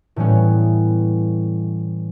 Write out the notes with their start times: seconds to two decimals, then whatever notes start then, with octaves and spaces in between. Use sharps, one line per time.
0.16 A2 E3 G3 B3 C#4